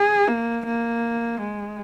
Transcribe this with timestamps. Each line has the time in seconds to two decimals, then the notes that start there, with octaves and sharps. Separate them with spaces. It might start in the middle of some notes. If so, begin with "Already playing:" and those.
Already playing: G#4
0.28 A#3
0.66 A#3
1.40 G#3